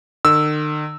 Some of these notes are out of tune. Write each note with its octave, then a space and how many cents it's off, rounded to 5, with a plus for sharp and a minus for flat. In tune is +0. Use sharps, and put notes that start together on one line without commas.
D#3 -45 E6 +0